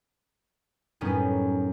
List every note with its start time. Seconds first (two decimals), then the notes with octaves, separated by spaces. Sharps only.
1.01 F#2 A2 G3 B3 C#4 D#4